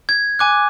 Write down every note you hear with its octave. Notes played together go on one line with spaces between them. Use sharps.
G#6
G#5 D6 F#6